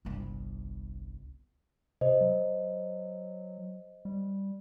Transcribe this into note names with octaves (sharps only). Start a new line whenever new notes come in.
G1 C2
C3 C5 D#5
F#3
G3